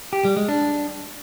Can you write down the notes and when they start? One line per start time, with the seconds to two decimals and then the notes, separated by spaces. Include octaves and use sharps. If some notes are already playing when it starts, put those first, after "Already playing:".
0.13 G4
0.25 G3
0.37 G#3
0.49 D4